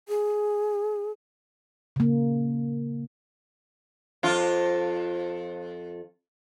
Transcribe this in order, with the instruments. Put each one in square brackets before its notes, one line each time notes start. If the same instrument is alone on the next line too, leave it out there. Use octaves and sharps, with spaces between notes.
[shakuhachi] G#4
[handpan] C#3 A#3
[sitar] F2 F4